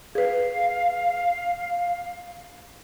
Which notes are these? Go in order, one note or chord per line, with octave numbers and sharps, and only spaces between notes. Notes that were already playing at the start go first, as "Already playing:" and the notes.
G#4 B4 F5